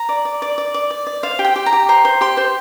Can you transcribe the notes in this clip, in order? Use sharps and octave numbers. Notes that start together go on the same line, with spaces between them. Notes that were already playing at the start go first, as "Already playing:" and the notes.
Already playing: A#5
D5
D5
D5
D5
D5
D5
D5
C5 F5
G4
G5
G4
A#5
G4
C5 A#5
C5
G4 C6
C5